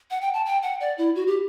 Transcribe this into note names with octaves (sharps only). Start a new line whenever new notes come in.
F#5
G5
A5
G5
F#5
D5
E4
F#4
G4